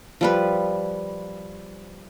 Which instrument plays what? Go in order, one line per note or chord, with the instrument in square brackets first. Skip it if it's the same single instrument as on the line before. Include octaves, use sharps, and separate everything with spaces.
[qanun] F3 G3 B4